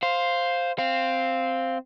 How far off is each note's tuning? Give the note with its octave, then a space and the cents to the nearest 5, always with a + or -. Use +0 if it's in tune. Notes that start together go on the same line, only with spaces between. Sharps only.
C5 +0 F5 +0
C4 +0 F5 +0